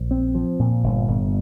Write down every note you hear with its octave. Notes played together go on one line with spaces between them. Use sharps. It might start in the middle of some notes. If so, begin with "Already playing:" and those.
Already playing: A#1
C4
F3
A#2
G1
G1